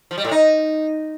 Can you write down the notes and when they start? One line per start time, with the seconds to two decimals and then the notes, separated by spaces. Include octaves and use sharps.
0.11 F3
0.18 G3
0.24 A2
0.31 D#4